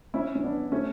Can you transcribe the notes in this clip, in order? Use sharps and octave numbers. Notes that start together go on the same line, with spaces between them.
C#4 E4
C#4
B3 D4
A3 C#4